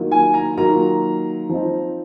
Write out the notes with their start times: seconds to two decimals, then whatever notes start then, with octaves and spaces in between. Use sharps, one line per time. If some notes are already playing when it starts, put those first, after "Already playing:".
Already playing: D#3 F#3 A#3 F4
0.11 G#5
0.34 A#5
0.58 D#3 F#3 A#3 F4 A#5
1.49 F3 C4 D#4